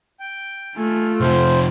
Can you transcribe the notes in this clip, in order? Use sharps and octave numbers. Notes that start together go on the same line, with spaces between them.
G5
A3 F4 G#5
C3 F3 C5